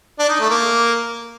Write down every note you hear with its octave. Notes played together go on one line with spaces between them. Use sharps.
D4
D#4
A3
A#3